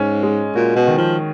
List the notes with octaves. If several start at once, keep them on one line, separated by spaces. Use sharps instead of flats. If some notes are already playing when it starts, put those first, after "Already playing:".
Already playing: G#2 C#4
G#3
A#2 F#4
B2
D#3
F3